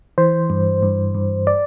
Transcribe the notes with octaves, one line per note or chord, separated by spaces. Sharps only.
E3 C5
G2
G2
G2
D5